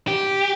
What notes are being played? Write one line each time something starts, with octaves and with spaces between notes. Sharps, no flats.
G4